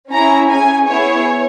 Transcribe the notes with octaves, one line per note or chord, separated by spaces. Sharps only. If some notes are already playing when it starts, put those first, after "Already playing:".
C#4 E4 G#4 A#5
C#4 G#4 G#5
B3 E4 G#4 C#5